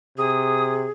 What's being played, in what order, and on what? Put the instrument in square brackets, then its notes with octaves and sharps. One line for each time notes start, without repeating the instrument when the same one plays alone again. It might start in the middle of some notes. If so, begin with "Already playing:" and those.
[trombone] C3 [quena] G#4 [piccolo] D#6